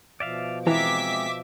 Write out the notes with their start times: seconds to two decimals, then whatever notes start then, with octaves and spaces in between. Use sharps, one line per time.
0.20 B2 F3 D5 E5 F5
0.67 E3 G#3 C4 E5 A#5 D6 B6